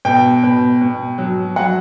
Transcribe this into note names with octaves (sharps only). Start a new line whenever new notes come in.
B2 G5
B2
B2
F#3
F#3 F#5